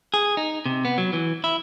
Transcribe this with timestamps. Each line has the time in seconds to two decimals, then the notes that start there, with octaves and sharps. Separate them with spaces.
0.14 G#4
0.37 D#4
0.66 C3
0.85 B3
0.98 F#3
1.13 E3
1.44 E4